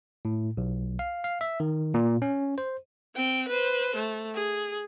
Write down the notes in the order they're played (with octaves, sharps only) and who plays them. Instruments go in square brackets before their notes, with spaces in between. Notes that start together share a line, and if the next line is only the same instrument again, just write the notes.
[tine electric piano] A2
B1
F5
F5
E5
D#3
A#2
C#4
C5
[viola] C4 G5
B4 C5
A3
G#4